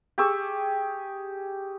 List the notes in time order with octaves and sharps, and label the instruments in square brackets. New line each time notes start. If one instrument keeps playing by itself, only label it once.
[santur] G4 G#4 C#6 E6